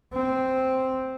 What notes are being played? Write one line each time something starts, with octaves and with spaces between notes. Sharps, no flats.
C4